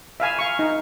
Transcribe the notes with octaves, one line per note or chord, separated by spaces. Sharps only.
E5 F5 G#5
F5 C#6
D#4